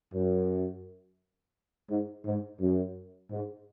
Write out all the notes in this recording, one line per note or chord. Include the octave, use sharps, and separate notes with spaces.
F#2
G#2
G#2
F#2
G#2